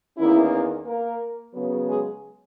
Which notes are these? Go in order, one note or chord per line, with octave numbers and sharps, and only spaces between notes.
E2 D#3 A#3 C#4 E4
A#3 A#4
C#3 F#3 B3
G#3 G#4